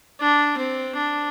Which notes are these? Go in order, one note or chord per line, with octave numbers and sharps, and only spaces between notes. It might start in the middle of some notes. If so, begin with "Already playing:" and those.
D4
C4
D4